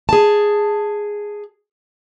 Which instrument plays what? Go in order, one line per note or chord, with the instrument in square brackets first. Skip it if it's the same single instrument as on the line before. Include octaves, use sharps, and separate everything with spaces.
[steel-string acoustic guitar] G#4 A5